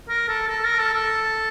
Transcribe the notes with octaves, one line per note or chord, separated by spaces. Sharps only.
A#4
A4
A4
A#4
A4
A4